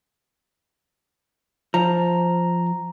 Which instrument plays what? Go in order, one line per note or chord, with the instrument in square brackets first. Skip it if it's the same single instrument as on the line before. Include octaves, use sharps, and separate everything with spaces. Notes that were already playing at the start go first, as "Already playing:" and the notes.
[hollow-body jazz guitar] F3 [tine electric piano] A#5